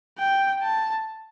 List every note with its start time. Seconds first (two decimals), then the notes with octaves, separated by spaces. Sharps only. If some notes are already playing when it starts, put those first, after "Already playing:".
0.19 G5
0.62 A5